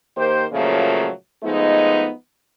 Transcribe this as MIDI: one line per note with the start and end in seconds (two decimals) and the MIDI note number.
0.17 0.46 51
0.17 0.46 58
0.17 0.46 67
0.17 0.46 72
0.52 1.09 46
0.52 1.09 49
0.52 1.09 53
0.52 1.09 54
0.52 1.09 57
0.52 1.09 58
1.43 2.11 53
1.43 2.11 56
1.43 2.11 57
1.43 2.11 59
1.43 2.11 63